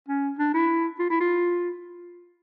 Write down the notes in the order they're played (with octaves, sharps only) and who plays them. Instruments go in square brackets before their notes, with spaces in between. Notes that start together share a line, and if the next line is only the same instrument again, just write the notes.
[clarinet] C#4
D4
E4
F4
E4
F4